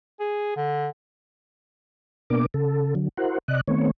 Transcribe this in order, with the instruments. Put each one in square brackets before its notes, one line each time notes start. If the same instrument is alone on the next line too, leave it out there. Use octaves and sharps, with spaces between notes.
[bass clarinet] G#4
D3
[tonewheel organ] B2 A#3 B3 D4 A#4 D6
C#3 A4
D3 F#3
E4 F#4 A#4 C5 F#5
C3 D5 D#5 F#6
D#3 A3 B3 C4 C#5